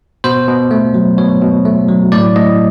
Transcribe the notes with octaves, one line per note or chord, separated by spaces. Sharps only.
B2 C5
B2
A3
F#3
B2 C#5
B2
A3
F#3
A2 D5
A2 D#5